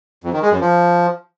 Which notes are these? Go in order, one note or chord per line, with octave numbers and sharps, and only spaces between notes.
F2
D#3
G#3
F#2
F3